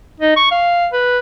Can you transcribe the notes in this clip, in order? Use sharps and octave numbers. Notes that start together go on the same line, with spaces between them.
D#4
C#6
F5
B4